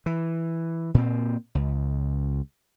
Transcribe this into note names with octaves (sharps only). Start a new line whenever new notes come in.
E3
A#2 C4
C#2